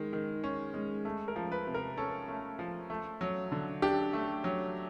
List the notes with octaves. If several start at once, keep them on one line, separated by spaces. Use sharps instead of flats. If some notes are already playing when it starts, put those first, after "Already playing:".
Already playing: D#3 G#3
D#3
C#4
G#3
A3
A#4
F3
B4
C3
A#4
C#4 A4
A3
F3
A3
F#3
D3
D4 G4
A3
F#3